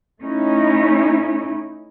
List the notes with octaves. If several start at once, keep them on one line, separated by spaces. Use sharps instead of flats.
A3 C#4 D#4 E4